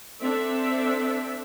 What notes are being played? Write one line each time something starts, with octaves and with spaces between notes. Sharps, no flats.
C4 D4 A4 E5